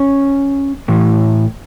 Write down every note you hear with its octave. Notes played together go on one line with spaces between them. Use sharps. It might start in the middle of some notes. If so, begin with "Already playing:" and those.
Already playing: C#4 C#5
A2 E3